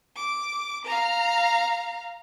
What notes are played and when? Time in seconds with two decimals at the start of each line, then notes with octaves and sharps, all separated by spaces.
0.16 D6
0.85 F5 A#5